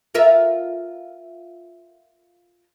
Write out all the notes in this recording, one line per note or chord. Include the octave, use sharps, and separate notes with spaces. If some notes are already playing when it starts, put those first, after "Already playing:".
F4 A#4 E5